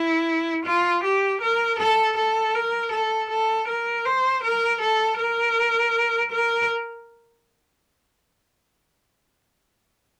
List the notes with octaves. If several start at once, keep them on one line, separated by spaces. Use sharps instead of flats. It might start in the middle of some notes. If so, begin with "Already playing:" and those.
Already playing: E4
F4
G4
A#4
A4
A4
A#4
A4
A4
A#4
C5
A#4
A4
A#4
A#4